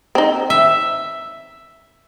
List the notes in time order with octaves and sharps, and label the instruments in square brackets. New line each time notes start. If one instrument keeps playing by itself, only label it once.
[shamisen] C4 D#4
[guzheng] E5